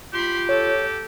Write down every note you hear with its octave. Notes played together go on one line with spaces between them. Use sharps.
F4 G4 B5 C6
A4 C#5